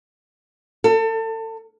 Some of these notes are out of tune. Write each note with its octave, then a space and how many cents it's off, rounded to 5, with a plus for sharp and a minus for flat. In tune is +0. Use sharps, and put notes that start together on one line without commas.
A4 +30